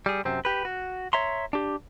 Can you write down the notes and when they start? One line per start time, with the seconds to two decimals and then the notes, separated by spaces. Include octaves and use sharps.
0.06 G3 G#4
0.25 F#2 C3 C4
0.45 G4 B4
0.65 F#4
1.13 C#5 E5 A#5 C6
1.53 D4 G4